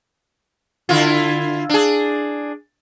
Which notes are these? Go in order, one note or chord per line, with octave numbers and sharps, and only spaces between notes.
D3 E4 F4
D4 G#4